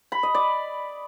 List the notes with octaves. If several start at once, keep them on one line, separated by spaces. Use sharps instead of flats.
B5
D#5
D5